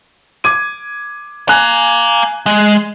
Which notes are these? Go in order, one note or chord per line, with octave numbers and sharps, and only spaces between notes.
D6 G#6 D#7
F5 G#5 A#5 F#6 G#6
G#3